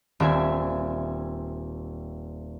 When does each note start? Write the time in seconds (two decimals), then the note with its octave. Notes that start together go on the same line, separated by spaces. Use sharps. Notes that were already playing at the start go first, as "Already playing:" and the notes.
0.20 D#1 C4 E5 G#5